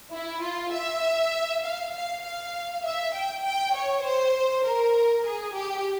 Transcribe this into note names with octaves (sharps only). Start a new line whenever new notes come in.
E4
F4
E5
F5
F5
F5
E5
G5
G5
C#5
C5
A#4
G#4
G4